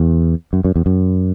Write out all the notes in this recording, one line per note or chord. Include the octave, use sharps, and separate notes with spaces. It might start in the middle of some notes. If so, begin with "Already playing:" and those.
Already playing: E2
F#2
F#2
E2
F#2